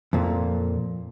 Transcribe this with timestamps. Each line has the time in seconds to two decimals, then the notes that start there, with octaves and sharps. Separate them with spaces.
0.13 F2 A#2